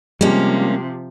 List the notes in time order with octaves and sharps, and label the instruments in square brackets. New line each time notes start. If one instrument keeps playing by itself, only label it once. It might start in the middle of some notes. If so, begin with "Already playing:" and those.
[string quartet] C3 F3 [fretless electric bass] G3 G#3 [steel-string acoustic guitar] A#3 C#4